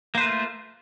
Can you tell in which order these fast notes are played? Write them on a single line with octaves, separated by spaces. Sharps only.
A#3 C5 B4 A3 F4